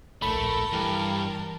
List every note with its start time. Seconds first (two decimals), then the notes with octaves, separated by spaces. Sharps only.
0.22 D1 A#1 A3 A#4 A5 B5
0.73 G2 E3